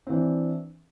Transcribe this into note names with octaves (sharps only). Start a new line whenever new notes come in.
E3 C4 D4